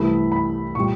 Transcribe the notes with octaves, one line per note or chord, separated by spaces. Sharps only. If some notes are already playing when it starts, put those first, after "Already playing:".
Already playing: C2 C3 E3 A3 B5
B5
A#2 G3 C#6